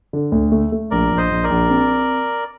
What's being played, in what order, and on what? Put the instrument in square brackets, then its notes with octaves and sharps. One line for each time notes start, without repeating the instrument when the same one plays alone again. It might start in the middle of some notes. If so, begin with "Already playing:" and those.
[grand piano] D3
D2
A3
A3
[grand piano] A#1 [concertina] A#4 D5
[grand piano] A#1
[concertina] C5 D#5
[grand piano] A#1
[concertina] A#4 D5
[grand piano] A#1
C4